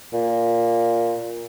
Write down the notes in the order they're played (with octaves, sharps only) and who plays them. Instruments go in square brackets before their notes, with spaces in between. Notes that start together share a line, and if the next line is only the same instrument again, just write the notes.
[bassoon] A#2